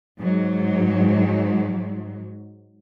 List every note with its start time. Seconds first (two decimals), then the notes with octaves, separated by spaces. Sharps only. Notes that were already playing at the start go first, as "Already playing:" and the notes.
0.20 G#2 F#3